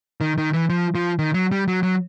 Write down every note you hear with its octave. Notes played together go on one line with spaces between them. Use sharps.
D#3
D#3
E3
F3
F3
D#3
F#3
G3
F#3
F#3